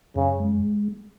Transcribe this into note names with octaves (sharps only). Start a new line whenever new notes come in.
F#2 C#3
G#3